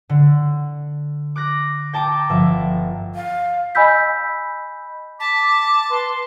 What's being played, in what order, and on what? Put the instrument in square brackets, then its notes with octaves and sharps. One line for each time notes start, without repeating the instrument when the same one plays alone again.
[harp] D3
D6 F#6 A#6
G5 A5 A#5 D6
G1 F3 E5
[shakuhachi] F5
[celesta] D#5 G#5 B5 E6 G6 B6
[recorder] A5 [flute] D6 [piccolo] B6
[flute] B4 [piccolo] C6